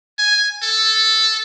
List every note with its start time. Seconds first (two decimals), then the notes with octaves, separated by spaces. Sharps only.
0.19 G#5
0.62 A4